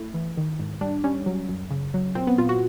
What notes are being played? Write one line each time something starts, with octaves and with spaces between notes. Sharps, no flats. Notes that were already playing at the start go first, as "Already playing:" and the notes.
Already playing: A3 E4
E3
D#3
G#2
G3 D4
G3 C#4
F#3
F#2
C#3
F#3
A#2 C4
B3
A#2 F4
F#4